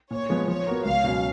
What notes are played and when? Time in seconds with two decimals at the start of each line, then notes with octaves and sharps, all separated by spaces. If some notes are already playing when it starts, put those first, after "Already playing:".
0.11 A#2 C#5
0.29 F3 G#3 B3
0.48 F3 C#5
0.67 B3 F#4 A#4
0.85 C#2 F5
1.04 B2 F#3 C#4